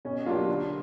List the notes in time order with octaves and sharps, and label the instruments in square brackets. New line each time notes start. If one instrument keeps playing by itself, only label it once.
[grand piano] B2 [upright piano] C#4
[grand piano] F#3 A#3 D4 G4 [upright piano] F4
[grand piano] D3